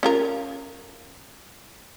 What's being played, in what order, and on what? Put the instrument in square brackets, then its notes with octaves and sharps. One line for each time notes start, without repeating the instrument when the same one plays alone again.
[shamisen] C#4 F4 A#4